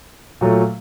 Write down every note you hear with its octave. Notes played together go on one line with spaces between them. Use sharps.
A#2 F#3 A3